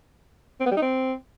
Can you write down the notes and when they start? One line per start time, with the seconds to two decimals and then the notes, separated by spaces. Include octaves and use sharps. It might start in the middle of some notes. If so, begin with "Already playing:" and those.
0.60 C4
0.66 B3
0.71 G3
0.77 D#4
0.82 C4